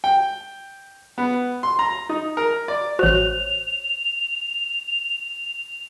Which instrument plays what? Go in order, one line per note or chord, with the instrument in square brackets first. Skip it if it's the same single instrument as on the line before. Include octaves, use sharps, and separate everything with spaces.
[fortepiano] G5
B3
C6
A#5
D#4
A#4
D5
[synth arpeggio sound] A1 F#4 [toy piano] C5 C#5 [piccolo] F7